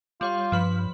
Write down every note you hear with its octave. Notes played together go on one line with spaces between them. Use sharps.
G3 F4 C#5 F5
G2 F3 B4 B5